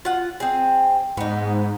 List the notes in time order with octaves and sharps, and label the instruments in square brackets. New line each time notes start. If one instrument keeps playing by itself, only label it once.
[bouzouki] F4 F#5
C4 G#4
[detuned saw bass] G#2 [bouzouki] B3 D#4